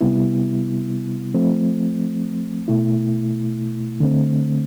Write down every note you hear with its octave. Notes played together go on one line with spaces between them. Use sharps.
C3 G3 B3 E4
F3 A3 C4
B2 A3 E4
D3 A3 C4